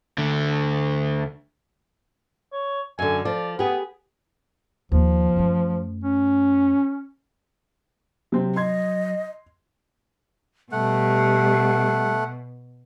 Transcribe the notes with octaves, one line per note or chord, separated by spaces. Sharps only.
D2 D3
C#5
F#2 D3 G#5
F3 D5
B3 G4 G#4
D#2 D#3 F3
F#2 A3
C#4
C3 F#3 C4
D#5 C6 G#6
B2 G3 A3 F#5